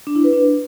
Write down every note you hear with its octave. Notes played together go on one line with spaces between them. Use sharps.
D4
E4
B4
D4